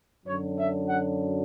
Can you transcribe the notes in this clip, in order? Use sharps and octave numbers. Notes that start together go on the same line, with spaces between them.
F#2 D3 F#3 C#5
E5
F#5